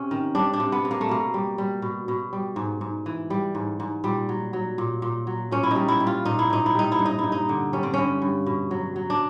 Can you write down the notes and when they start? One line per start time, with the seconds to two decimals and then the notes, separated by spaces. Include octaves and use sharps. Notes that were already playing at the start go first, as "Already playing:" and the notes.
Already playing: C3 C#4
0.11 D#3
0.35 G3 D4
0.53 D4
0.60 C3
0.72 B3
0.85 C3
0.91 A#3
1.01 A3
1.09 B2 A#3
1.34 G3
1.58 G3
1.82 B2
2.08 B2
2.33 G3
2.56 G#2
2.81 G#2
3.06 E3
3.30 G3
3.55 G#2
3.80 G#2
4.04 A#2 G3
4.29 F#3
4.53 F#3
4.78 A#2
5.02 A#2
5.27 F#3
5.51 A#2 C#4
5.63 E4
5.71 D#4
5.76 G3
5.88 E4
6.00 G3
6.07 F4
6.25 A#2 D#4
6.39 E4
6.50 A#2 D#4
6.66 E4
6.75 G3 D#4
6.92 E4
6.99 G2
7.06 D#4
7.19 G2 E4
7.32 D#4
7.49 D3
7.73 G3 C#4
7.83 C4
7.94 G2 C#4
8.22 G2
8.46 B2
8.71 F#3
8.96 F#3
9.10 D4